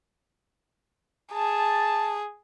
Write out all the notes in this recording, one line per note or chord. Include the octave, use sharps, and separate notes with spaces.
G#4 A5